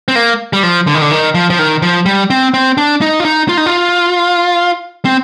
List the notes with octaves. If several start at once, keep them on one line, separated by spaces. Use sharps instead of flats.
C4
A#3
G3
F3
D3
D#3
D3
D#3
F3
F3
D#3
F3
G3
C4
C4
D4
D#4
F4
D#4
F4
D#4
F4
C4